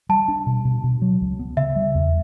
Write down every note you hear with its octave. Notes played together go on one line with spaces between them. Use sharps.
G3 A5
D4
B2
B2
B2
F#3
C#2
B3
C#3 E5
G3
E2